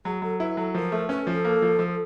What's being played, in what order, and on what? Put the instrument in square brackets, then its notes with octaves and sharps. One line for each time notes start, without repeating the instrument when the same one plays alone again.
[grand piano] F#3 [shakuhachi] G#4
[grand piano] F#3 [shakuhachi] A4
[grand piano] E4 [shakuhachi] B4
[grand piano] F#3 [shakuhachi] A4
[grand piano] F3 [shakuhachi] A#4
[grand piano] A3
[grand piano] C#4 [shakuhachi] B4
[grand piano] F3
[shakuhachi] A4
[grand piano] A#3
F3
F3